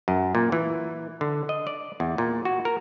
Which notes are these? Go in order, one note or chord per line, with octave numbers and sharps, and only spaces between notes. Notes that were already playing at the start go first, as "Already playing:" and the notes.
F#2
A#2
E3
D3
D#5
D5
E2
A#2
F#4
A#4